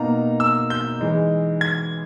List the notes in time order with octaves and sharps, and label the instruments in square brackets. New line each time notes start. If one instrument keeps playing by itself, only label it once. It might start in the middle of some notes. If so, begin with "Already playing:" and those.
Already playing: [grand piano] B2 A#3 D#4 A#5
E6
G6
E3 G#3 D#4
G#6